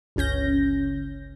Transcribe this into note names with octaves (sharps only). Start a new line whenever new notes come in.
G1 C#2 C#4 G6 A#6